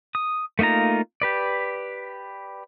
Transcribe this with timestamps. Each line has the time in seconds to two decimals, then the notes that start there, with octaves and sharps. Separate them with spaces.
0.15 D#6
0.59 A3 A#3 D#4 F4 A#5
1.22 G4 B4 D5